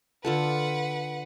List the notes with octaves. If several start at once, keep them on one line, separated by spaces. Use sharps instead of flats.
D3 F4 A4 B4 F#5